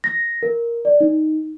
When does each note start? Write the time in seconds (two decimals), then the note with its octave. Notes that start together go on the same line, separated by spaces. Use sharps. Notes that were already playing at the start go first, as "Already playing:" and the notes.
0.04 A#6
0.43 A#4
0.85 D5
1.00 D#4